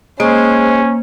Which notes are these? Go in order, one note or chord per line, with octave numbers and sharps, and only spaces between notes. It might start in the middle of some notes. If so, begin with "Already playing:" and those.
G#3 A#3 C#4 C5